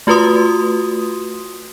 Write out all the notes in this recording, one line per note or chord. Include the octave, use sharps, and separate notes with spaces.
A3 F4 F#4 B4 C6 D#6